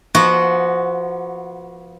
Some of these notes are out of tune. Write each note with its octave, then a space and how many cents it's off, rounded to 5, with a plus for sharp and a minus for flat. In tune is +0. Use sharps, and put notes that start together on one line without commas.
F3 -10 B3 -30 F#4 +0